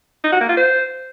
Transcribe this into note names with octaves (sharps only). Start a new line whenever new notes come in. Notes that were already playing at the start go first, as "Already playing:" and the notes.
D#4
F#4
A#3
F4
C5